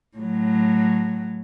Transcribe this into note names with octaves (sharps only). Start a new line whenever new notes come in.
A2 F#3